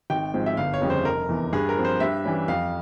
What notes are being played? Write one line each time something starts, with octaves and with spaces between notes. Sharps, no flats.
G#1 G5
G#2 F3 C4
E5
G1 F5
C#5
F2 C#3 G3
C5
F1 A#4
E2 E3
G2 G#4
A#4
F3 C4
C5
G2 E5
E3 G3 C#4
F2 F5